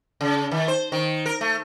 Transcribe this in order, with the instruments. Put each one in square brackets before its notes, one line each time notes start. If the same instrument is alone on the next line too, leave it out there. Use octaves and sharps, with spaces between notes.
[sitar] C#3
D#3
C5
D#3
A#4
A3